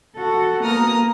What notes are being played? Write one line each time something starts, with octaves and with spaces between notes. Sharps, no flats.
F#4 A4
A#3 B3 A#5 D#6 F6